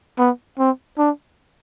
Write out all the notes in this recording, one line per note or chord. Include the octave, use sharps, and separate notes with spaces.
B3
C4
D4